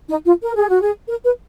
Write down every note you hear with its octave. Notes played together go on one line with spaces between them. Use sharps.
D#4
F4
A#4
G#4
F#4
G#4
A#4
B4